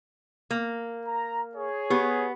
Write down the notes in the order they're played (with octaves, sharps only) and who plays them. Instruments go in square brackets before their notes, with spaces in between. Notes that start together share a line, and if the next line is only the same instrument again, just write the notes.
[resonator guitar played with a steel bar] A#3
[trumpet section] A#5
G#4 C#5
[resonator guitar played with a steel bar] B3 [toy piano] G4